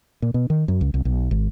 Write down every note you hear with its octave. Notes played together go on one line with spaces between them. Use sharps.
A#2
B2
D#3
F#2
C#2
C2
B1
G#1